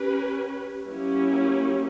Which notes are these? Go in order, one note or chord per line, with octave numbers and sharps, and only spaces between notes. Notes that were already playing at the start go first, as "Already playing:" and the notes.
Already playing: C#4 G4 B4
F#3 A#3 C#4 E4 G4